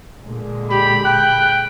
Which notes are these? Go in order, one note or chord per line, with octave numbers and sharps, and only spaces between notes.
A#2 D3 G#3
G4 B5
G5 F#6